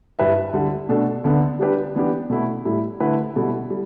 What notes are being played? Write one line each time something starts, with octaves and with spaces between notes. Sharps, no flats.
G2 G3 E4 B4 E5
D2 D3 G3
B2 A3 D4 A4
D2 D3 B3 D4
G3 D4 G4 B4
E3 B3 D4 G4
B2 A3 E4
A2 G3 E4
D3 A3 E4 B4
B2 G3 E4 A4
G3